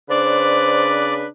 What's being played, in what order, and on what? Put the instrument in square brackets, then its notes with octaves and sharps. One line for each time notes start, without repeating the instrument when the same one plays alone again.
[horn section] C#3 D4 B4 [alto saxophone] C5 [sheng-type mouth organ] D5